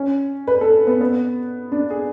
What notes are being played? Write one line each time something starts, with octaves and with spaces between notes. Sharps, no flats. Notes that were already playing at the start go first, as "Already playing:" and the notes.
Already playing: C#4
B4
A4
B3
B3
D4
G#4